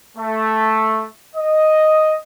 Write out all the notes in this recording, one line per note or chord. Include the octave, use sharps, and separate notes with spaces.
A3
D#5